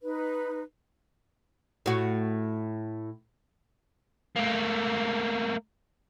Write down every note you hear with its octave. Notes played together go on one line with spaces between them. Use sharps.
D#4 B4
A2 F#4
A3 A#3